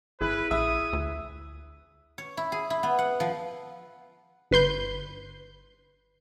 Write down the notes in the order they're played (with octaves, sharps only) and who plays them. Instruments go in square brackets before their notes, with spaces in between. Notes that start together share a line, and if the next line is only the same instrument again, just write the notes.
[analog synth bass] G#1 [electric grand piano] E4 G#4 [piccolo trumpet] B4
[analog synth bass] A#1 [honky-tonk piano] E5 [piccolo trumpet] D#6
[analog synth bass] D2
[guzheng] C#5
E4
G#4
E4
B3
F#5
F3
[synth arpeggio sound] G1 B4 C6 G6